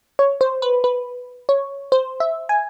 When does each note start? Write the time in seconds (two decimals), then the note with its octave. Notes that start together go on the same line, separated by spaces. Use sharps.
0.19 C#5
0.41 C5
0.62 B4
0.84 B4
1.49 C#5
1.92 C5
2.20 E5
2.49 G#5